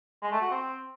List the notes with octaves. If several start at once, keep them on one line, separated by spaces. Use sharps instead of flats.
G#3
A3
F#4
C4